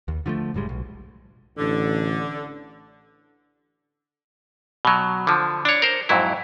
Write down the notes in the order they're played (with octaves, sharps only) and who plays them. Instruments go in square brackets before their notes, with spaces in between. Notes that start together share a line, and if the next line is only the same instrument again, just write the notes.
[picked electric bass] D#2
D3 F3 F#3 A3
F#1 A2 G3 G#3
B1
[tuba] A1 [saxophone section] D3
[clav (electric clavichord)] B2 F#3
D3 F3
D4 C#5
A#4 C5
F2 G#2 F#3 E4